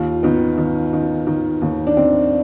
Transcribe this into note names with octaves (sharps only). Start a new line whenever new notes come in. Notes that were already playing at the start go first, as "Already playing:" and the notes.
Already playing: D#2 F4
D#3 B3
D#3
D#3
D#3
D#2
D4
D#3 C4